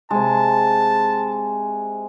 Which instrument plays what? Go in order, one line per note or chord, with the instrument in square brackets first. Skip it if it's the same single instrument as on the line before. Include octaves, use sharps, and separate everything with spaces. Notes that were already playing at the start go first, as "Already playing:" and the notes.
[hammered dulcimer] C3 G#3 [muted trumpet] A5